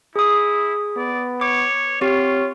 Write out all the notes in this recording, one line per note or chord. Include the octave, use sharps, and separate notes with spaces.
E4 G#4 D#6
B3 D5
C#5 D6
C4 F4 G4 C#5